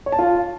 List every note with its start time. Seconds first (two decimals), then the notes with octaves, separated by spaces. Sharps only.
0.06 C#5
0.12 A5
0.19 F4